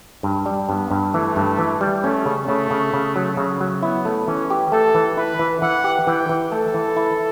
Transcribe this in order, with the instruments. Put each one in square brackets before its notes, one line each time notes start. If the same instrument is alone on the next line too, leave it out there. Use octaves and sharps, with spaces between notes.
[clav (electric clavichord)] G2
G3
[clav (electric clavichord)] G2 [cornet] B3
[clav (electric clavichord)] G2
[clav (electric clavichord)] E3 [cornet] A3
[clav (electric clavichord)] G2
E3
G3
[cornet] A3 [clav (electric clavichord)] C#4
[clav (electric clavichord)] C#3
[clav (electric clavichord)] C#3 [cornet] A3
[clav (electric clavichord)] C#3
C#3
F#3
C#3
F#3
[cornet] B3 [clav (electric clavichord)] E4
[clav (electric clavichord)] A3
[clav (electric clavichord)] E3 [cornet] C#4
[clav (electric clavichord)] G4
[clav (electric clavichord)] A3 [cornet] A4
[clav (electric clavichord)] E3
[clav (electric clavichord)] E4 [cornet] B4
[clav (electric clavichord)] E3
[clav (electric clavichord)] E3 [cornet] F#5
[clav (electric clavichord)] G4
[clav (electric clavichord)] E3 [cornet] G5
[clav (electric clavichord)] E3
[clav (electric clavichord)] A3 [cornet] A4
[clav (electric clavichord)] E3
E4